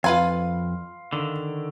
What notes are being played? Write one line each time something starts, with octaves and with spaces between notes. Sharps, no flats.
F2 F4 B4 F5 G#5 C6
D3 D#3